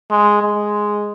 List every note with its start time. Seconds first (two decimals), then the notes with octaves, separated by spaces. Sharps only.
0.11 G#3
0.42 G#3